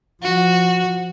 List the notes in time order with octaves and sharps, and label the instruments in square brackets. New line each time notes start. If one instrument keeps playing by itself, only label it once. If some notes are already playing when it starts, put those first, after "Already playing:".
[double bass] F3 [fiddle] F#4